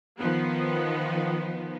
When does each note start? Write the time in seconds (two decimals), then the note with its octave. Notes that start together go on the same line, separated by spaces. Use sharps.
0.19 D#3 F3 B3